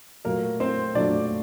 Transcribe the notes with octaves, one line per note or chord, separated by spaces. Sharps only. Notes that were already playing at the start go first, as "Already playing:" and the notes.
A#2 F#3 A3 A#3 A#4
C4 C5
A#2 F#3 A3 D4 D5